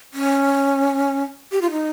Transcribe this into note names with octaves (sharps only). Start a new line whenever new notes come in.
C#4
G4
F4
D#4